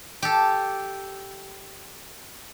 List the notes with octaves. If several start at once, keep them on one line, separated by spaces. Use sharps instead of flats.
G4 A4